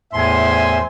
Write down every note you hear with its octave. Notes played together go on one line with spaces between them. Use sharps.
E2 A2 C5 E5 G#5 C6